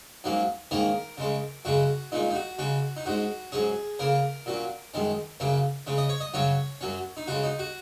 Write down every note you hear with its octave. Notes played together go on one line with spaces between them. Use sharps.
G#2 F#3 A#3 C#4
G#2 D#3 A#3 C#4 A#4
C#3 G#3 C#4
F#2 C#3 G#3 C#4 F#4
A#2 G#3 C#4 D#4
D#4
F#4
C#3 G#3 C#4 F#4
D#4
G#2 G#3 C#4 F#4
G#2 F#3 C#4 G#4
C#3 A#3 C#4 A#4
A#2 F#3 C#4
F#2 D#3 G#3 C#4
F#2 C#3 A#3 C#4
C#3 G#3 C#4
D#5
C#5
D#5
F#2 C#3 F#3 C#4 C#5
F#2 F#3 C#4
D#4
C#3 G#3 C#4 F#4
D#4
F#4